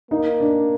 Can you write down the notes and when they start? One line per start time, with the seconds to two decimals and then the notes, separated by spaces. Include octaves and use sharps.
0.11 A#3 D#4
0.40 D4